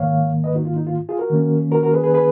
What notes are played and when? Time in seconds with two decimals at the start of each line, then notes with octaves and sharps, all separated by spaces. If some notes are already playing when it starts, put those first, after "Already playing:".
Already playing: G#2 D#3 A#3 C#5 F5
0.44 B4 D#5
0.55 D#4 F#4
0.65 F4
0.76 D#4
0.87 F4
1.09 F4 G#4
1.19 F#4 A#4
1.30 D#3 A#3 C#4
1.72 F#4 A#4
1.83 F#4 A#4
1.93 G#4 B4
2.03 G#4 B4
2.14 G#4 B4